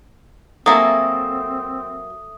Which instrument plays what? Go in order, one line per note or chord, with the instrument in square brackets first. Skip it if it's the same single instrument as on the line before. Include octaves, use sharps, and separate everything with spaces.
[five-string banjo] F#3 A#3 G#4 [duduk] C4 [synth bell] A4 E5 [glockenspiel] D#6